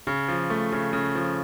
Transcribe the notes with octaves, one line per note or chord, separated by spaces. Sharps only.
C#3
F3
A3
C#3
C#3
F3